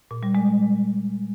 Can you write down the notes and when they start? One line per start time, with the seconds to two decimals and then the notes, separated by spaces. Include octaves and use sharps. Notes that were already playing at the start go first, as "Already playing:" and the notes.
0.11 A#2
0.23 G3
0.35 G#3